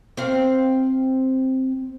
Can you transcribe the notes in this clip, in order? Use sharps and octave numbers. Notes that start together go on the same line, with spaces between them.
C4 F5